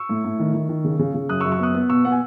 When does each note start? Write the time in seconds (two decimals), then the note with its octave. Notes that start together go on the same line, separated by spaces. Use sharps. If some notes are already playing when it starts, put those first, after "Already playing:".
Already playing: C#6 E6
0.09 A2
0.24 A2
0.39 D#3
0.54 D#3
0.69 D#3
0.84 C#3
0.99 C#3
1.14 C#3
1.29 F#2 D#6 F#6
1.40 C#6 E6
1.44 F#2
1.52 C#6 E6
1.59 B3 D#6 F#6
1.74 B3
1.89 B2 C#6 E6
2.05 B3 F#5
2.12 G#5